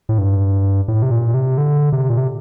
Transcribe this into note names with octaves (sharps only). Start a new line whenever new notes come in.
A2
G2
A2
C3
A#2
C3
D3
C3
A#2
C3